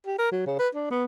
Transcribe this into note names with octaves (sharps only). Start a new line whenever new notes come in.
G4
A#4
F#3
C#3
B4
D4
B3